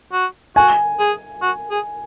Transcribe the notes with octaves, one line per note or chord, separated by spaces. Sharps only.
F#4
F#4 G#5
G#4
F#4
G#4